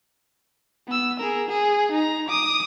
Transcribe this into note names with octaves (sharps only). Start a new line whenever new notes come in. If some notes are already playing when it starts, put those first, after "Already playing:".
B3 E6
G#4 A#4
G#4
D#4 A#5
D6 D#6